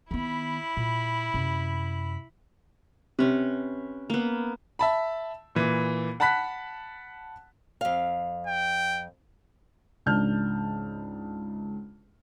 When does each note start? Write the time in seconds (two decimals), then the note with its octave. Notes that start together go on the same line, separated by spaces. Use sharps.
0.11 D#3 B3 E4 B5
0.77 A#2
1.34 F#2 C3
3.19 C3 C#4 B4
4.10 A#3 B3
4.79 E5 A5 B5
5.55 A#2 E3
6.20 F#5 A5 B5 F#6 B6
7.81 F2 F5
8.47 G5
10.06 C#2 G#2 D4 A5 F6 G6